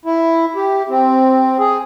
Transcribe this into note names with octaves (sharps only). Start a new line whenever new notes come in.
E4
G4
C4
G#4